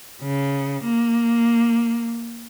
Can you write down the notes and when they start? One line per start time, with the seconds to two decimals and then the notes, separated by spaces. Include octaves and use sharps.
0.23 C#3
0.84 A#3